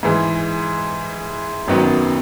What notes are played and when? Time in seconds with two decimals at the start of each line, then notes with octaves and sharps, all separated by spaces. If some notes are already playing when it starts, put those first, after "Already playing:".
0.03 G#2 E3 G#3
1.68 G#1 F#2 D#3 F#3 B3